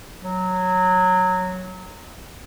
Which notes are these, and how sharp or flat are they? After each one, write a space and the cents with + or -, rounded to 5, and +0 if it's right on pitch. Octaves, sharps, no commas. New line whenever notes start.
F#3 -10